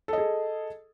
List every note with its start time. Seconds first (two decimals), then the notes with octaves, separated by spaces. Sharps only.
0.08 A4
0.13 D#5
0.18 G#4